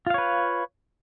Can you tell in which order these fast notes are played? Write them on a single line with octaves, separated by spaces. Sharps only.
F4 F5 C#5 B4